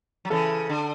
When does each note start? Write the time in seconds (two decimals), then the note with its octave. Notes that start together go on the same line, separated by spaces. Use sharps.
0.25 F#3
0.30 C#3 E3 A4
0.69 D3